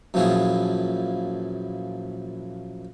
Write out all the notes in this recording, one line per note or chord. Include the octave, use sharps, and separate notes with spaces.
F#2 A#2 F3 B3 E4 G#4